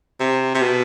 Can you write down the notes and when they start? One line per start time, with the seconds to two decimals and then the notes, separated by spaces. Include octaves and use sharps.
0.20 C3
0.55 C3
0.62 B2